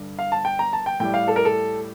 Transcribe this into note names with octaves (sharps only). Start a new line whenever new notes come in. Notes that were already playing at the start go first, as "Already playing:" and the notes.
Already playing: G2 D3 G3
F5
A5
G5
A#5
A5
G5
A2 G3 G5
F5
A4
A#4
A4